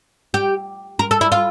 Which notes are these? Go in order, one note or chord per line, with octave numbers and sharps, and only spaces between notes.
G4
A#4
A4
E4
F4